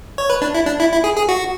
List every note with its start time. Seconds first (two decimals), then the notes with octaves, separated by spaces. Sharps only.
0.18 C#5
0.30 B4
0.42 D4
0.55 E4
0.66 D4
0.80 E4
0.92 E4
1.04 G#4
1.17 G#4
1.29 F#4